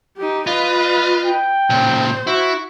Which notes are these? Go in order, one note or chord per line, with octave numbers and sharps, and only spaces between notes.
D#4 G4
F4 B4 D#5
G5
A#2 C#3 C5
E4 F#4